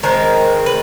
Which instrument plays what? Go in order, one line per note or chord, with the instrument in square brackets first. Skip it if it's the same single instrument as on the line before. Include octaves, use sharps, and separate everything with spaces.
[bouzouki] D#3 G#3 C4 A#4
B4